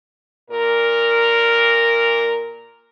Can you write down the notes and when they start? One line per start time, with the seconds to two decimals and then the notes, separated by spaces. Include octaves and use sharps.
0.51 A#2 A#4